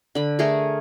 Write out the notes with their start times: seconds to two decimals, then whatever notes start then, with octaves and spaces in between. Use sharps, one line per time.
0.15 D3 B5
0.39 A3 G#4 A#4